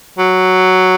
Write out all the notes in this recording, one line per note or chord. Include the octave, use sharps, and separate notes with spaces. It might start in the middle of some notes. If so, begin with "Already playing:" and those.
F#3